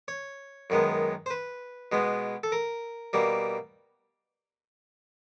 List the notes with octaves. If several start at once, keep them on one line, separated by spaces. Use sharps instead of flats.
C#5
F#2 D#3 G#3 B3
C5
B4
B2 G#3 B3
A4
A#4
B2 G3 A#3